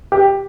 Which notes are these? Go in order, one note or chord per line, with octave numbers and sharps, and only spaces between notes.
G4